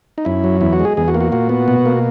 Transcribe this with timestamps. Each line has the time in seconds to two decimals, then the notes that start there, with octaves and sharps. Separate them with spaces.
0.18 D#4
0.25 F#2 E4
0.44 F#3
0.61 E2 E4
0.73 F#4
0.80 G#3
0.85 G#4
0.97 E2 G#4
1.08 F#4
1.14 A#3
1.21 F#4
1.32 A#2 F#4
1.49 B3
1.68 B2
1.86 A#3